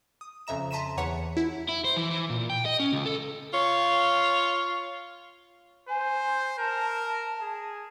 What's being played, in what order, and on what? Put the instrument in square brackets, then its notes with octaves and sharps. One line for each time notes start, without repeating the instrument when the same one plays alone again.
[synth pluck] D#6
F2 C#3 E5 A#5 E7
A5 A#5 C6 B6 D#7 E7
E2 E3 C#5 F#5 C#7
E4
[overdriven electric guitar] E4
C5
E3
E3
A#2
G5
D#5
C#4
C#2
A4
[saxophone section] F4 C#5
[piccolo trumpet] C5 [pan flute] G#5
[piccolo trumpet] A#4 [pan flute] A5
[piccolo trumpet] G#4